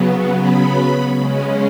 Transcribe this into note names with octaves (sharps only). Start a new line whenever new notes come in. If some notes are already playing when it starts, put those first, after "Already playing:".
Already playing: C#3 F#3 B3
B5
C#3 G#3 C#4